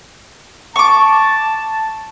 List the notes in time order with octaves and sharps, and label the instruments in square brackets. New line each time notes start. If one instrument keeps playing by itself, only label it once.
[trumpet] A5 [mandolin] C#6 D6